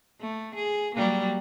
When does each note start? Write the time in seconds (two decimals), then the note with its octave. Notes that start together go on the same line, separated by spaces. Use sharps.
0.21 A3
0.56 G#4
0.96 F#3 G3 A#3